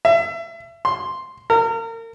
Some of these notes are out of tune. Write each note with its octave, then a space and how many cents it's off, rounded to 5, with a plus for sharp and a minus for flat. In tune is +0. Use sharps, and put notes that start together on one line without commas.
E5 +30
C6 +0
A#4 -35